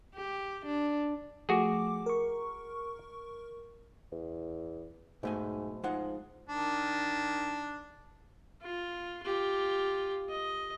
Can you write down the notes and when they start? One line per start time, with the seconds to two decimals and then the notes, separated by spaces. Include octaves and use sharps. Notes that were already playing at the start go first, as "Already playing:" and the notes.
0.15 G4
0.66 D4
1.49 F3 A3 F#4 G#4 D6
2.06 A#4 C#6
4.12 E2
5.23 B1 G#2 A3 G#5
5.84 F3 G#3 D#4 F#5
6.49 D#3 D4
8.62 F4
9.23 F4 G4
10.29 D#5